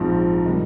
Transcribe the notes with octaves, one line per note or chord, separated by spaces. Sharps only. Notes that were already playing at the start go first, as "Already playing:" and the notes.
Already playing: A#1 G#2 F3 C4
C3 D#3 G3 D#5